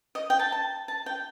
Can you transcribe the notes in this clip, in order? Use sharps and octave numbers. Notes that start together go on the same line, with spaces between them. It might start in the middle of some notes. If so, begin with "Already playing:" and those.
D#5
G5
A5
A5
A5
G5